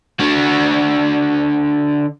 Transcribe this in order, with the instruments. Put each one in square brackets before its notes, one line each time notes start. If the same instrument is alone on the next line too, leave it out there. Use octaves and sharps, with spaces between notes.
[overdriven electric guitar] D3 F#4